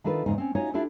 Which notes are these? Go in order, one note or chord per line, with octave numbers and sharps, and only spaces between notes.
D#3 D4 D#4 F4 A4 B4
E2 G#2 C#3 D#4
C4 C#4
C#4 D#4 F4 F#4 C#5
D4 E4 F4 G4 A4 C5